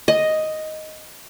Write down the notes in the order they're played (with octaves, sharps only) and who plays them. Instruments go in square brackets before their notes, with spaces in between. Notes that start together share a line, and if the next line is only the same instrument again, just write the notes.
[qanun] D#5